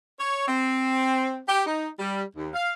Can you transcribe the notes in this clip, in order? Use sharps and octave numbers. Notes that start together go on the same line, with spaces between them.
C#5
C4
G4
D#4
G3
D#2
F5